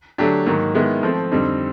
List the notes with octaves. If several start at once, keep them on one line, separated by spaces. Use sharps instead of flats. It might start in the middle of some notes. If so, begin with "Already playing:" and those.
D3 F#3 A3 D4 G4
G#2 D#3 F#3 A#3
D#3 G#3 B3 E4
F3 A3 C4
F2 D3 G3 C4 D#4